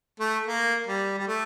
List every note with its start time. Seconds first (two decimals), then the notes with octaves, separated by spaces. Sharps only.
0.20 A3
0.47 A#3
0.87 G3
1.18 G3
1.27 A3